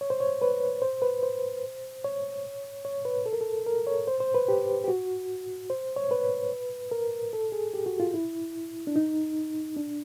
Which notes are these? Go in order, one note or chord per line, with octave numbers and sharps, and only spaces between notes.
C#5
C5
C#5
B4
C5
B4
C5
C#5
C#5
B4
A4
A#4
A4
A#4
C#5
C5
C5
B4
G4
G4
F#4
C5
C#5
B4
A#4
A4
G#4
G4
F#4
F4
E4
D4
D#4
D4